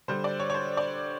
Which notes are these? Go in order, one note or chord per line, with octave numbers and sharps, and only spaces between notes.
D3 G3 C5
D5
C#5
C#5
C5
D5